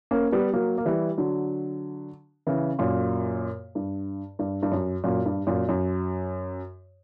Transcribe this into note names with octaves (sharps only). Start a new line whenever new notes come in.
A#3 C#4
G3 B3
F#3 A#3
A#3
E3 G3
D3 F#3
C#3 E3
F#2 A#2
G2
G2
G2
F#2
F#2 A#2
G2
F#2 A#2
F#2